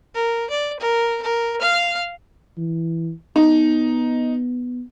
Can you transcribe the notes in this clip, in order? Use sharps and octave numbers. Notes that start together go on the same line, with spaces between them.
A#4
D5
A#4
A#4
F5 F6
E3
B3 D#4